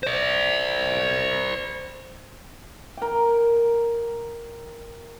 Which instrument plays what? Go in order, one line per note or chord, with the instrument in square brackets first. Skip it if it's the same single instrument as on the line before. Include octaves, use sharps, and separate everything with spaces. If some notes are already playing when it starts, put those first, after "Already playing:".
[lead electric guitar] C5 D5
[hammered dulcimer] A#4 G5